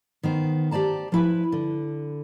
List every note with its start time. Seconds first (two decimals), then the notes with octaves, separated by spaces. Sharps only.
0.23 D#3 B3 C5
0.71 G4 C5 D5 A5 A#5
1.12 F3 E4 B4
1.52 D3